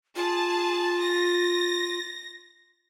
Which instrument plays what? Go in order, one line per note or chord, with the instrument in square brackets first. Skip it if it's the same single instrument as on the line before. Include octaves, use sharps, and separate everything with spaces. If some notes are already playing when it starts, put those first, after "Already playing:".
[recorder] F4 [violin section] G#4 A5
[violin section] A#6